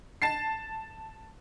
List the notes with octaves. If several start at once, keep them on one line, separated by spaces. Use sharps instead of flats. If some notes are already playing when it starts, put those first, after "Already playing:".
A5 A6 C7